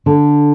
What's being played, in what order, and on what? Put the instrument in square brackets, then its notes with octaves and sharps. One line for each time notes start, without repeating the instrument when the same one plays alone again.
[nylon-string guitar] D3